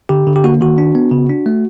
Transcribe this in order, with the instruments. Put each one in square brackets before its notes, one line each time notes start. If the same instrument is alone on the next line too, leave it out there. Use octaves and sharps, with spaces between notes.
[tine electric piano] D3 G4
D3
G4
A#3 F#4
D#3 F#4
D4
B3
C#3
D4
A3